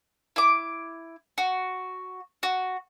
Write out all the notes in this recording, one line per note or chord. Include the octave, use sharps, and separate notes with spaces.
E4 D6
F#4
F#4